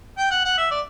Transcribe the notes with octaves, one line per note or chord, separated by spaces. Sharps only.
G5
F#5
F#5
E5
D5